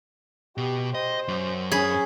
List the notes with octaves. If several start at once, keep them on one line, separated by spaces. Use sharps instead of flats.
B2 G4
C5 D#5
F#2
C#4 G#4 B5